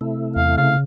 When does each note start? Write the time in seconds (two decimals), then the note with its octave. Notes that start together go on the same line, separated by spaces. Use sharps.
0.01 C3 A3 E4
0.36 E2 F5
0.57 C#3 F5